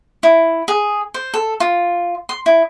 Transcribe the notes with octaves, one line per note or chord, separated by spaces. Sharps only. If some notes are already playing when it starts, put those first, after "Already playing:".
E4
G#4
C5
A4
F4
C6
E4